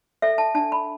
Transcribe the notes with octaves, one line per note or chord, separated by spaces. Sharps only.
A4 E5
A5
D4 A5
B5